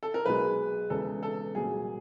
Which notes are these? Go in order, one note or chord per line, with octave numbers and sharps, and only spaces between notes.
A4
A#4
B1 B2 G#3 B4
E1 E2 C#3 A4
A4
C2 A#2 F#3 A#3 G#4